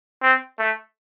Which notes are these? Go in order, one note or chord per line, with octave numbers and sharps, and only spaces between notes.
C4
A3